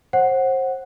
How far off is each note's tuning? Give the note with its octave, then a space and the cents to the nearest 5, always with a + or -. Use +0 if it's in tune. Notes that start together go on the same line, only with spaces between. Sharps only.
C5 +30 F#5 +0